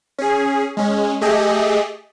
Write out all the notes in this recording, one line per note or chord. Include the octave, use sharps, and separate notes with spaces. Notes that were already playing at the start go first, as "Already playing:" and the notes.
C#4 G#4
G#3 C#4
A3 G4 G#4 D#5 E5